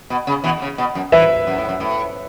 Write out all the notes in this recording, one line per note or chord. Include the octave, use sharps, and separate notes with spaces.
B2
C#3
B2 E3
C#3
B2
F#2
E3 B4 E5
F#2
A2
F#2
A2